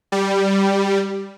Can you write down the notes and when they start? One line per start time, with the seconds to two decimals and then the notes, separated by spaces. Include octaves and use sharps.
0.12 G3